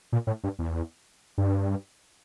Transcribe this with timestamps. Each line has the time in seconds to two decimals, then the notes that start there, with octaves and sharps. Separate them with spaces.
0.12 A#2
0.27 A2
0.44 G2
0.59 E2
1.38 G2